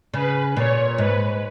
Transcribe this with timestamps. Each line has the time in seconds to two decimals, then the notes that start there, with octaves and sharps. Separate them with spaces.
0.14 C#3 B4
0.56 A#2 C#5
0.98 G#2 B4